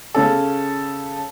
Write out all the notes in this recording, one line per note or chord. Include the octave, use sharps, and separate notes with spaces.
C#3 C#4 A4